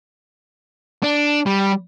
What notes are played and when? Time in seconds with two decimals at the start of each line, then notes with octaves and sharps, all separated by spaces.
1.03 D4
1.46 G3